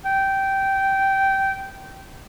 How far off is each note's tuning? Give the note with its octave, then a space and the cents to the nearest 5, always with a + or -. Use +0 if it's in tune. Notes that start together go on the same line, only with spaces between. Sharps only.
G5 -15